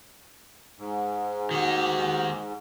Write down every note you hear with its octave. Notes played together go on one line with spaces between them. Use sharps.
G#2
D#3 F#4 G4